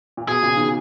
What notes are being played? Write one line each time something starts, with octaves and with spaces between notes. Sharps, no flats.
A#2
B2 G#4
A#2 C#3
B2 D#3